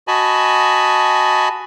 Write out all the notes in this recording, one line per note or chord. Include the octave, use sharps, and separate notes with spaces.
F#4 D#5 G#5 A5 B5